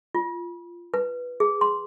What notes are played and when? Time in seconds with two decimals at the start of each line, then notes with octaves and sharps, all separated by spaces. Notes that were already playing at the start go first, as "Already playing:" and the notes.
0.15 F4
0.94 B4
1.40 G#4
1.61 C6